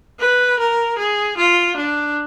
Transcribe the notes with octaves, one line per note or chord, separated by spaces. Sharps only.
B4
A#4
G#4
F4
D4